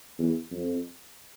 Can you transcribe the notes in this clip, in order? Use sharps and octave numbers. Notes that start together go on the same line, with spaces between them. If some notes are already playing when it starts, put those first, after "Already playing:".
E2
F2